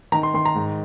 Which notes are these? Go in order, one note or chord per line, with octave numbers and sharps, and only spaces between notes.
D#3 A#5
C6
D#3 C6
A#5
G#2